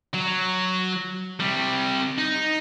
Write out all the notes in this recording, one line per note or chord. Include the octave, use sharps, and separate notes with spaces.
F#3
C3 G3
D#4